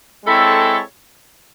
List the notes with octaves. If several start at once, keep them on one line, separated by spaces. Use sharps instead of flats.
G#3 C4 E4 A4 C#5